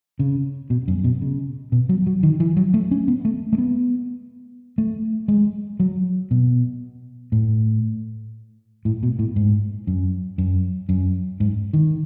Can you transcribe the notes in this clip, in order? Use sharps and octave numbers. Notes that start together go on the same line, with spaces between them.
C#3
B2
F#2
B2
C#3
B2
F#3
F#3
D#3
E3
F#3
A3
C#4
B3
A3
A3
B3
A3
G#3
F#3
B2
A2
A2
B2
A2
G#2
F#2
F#2
F#2
G#2
D#3